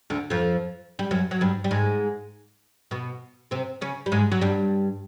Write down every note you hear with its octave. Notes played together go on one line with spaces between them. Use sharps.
D2 D3
F2 F3
G3
F#2 F#3
F#3
G2 G3
G3
G#2 G#3
B2 B3
C3 C4
C#3 C#4
G3
G#2 G#3
F#3
G2 G3